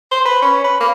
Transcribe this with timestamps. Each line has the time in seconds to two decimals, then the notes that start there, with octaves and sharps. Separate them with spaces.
0.11 C5
0.25 B4
0.42 C#4
0.64 B4
0.80 A#3